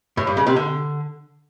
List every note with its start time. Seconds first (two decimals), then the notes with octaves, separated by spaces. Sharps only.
0.17 A2
0.27 G2
0.37 C#3
0.47 C3
0.56 D3